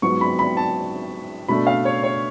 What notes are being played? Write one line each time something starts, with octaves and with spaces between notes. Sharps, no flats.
G#2 F#3 B3 F4 C#6
B5
B5
A5
B2 A3 D4 B5
F5
C#5
C#5